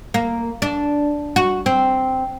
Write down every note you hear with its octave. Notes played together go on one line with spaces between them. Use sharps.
A#3
D4
F#4
C4